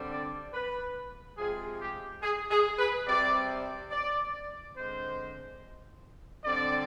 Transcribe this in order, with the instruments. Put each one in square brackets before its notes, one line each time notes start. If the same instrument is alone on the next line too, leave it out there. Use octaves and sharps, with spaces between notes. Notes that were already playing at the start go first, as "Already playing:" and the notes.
Already playing: [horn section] D3 G3 C4
D5
B4
C3 F3 G#3 C4 G#4
G4
G#4
G#4
B4
C3 G3 C4 D5
D5
D3 G#3 C4 C5
D3 G3 C4 D5